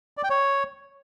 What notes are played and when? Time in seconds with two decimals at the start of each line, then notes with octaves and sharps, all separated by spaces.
0.17 D5
0.24 G5
0.30 C#5